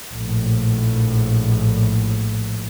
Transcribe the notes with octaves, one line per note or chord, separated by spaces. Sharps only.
A#1 A2